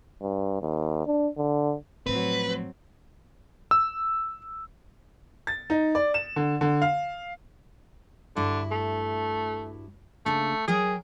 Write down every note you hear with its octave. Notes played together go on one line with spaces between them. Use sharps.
G2
D#2
D4
D3
A2 F3 F#3 C4 B4
E6
A6
D#4
D5
E7
D3
D3
F5
G2 D3 E4 F#4
A3
C#3 A3 A#3 D4
F#3 G#4 A#4 G5